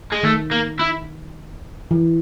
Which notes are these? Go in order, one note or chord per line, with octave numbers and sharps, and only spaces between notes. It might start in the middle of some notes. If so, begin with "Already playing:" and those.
G#3
D#3 A3
A#3
E4
E3